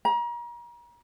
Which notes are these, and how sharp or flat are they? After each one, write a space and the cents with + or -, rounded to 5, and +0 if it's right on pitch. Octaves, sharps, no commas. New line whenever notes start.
A#5 +35